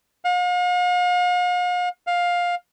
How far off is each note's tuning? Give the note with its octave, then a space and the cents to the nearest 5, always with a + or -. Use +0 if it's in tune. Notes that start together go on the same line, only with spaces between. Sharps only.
F5 +45
F5 +15